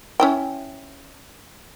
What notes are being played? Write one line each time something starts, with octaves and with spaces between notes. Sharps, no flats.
C#4 E4 G5